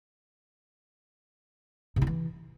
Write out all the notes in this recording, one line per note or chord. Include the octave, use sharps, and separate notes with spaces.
C3
E4
E3